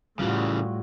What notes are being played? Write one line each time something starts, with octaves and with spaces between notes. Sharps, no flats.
A2 C#3 E3 G3 F4 F#4